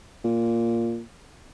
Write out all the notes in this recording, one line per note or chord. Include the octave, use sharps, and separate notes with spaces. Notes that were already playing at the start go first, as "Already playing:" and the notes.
A#2